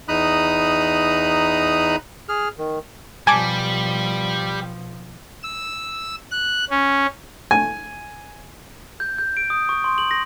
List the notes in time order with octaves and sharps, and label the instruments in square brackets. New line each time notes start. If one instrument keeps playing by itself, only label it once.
[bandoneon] E2 D#4 A#5 B5 D#6 F#6
G#4 F6
D#3
[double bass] B2 F3 [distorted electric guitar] G3 [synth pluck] G#5 A5 D6
[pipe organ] E6
F#6
C#4
[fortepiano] G#5
[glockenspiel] G6
G6
D7
D#6
C#6
C6
F#7
A#6